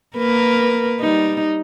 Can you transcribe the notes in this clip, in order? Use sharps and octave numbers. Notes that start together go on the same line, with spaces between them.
A#3 A#4 B4
G3 D#4